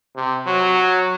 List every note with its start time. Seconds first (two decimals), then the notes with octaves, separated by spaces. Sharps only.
0.16 C3
0.46 F#3